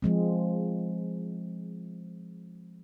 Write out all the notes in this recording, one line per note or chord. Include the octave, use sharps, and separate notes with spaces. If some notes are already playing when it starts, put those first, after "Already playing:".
F3 G#3 C4